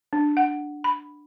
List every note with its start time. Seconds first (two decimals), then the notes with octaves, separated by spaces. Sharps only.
0.13 D4
0.37 F#5
0.84 B5